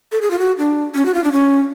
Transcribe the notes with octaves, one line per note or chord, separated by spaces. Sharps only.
A4
G#4
F4
F#4
D4
C#4
F#4
F4
D4
C#4